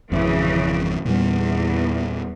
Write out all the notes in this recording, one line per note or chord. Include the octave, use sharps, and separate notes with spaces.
G#1 F2 C#3 E3
E2 A#2 G3